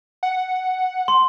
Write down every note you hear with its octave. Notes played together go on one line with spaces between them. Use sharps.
F#5
C6